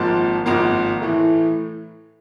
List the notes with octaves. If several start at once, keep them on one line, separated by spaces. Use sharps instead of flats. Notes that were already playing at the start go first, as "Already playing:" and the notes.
Already playing: G#1 G#2 F3 A#3 A5
G#1 G#2 F3 A#3 A#5
A2 E3 A3